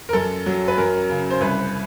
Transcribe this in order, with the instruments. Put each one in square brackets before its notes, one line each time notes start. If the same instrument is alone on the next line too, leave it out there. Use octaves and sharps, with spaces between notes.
[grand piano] A#4
F#2 A4
F#3
B4
F#2 A#4
C#3
C5
C2 B4